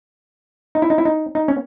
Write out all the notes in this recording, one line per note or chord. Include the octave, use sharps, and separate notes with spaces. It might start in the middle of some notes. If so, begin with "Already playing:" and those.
D#4
E4
D#4
E4
D#4
D#4
C#4